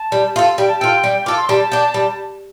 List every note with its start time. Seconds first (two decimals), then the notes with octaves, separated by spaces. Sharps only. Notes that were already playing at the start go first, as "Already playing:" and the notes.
Already playing: A5
0.12 G3
0.36 F4 A4
0.58 G3 G5
0.68 A5
0.79 F4 A4 G5
1.04 G3
1.26 F4 A4 D6
1.37 C6
1.49 G3 A5
1.72 D4 G4
1.94 G3